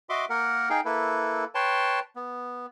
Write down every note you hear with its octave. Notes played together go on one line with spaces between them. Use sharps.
F#4 D#5 E5 C6 D6
A#3 A#4 F#5
D#4 G#4 F5 G5
A#3 E4 A4 B4
B4 C#5 G5 A5 C6
B3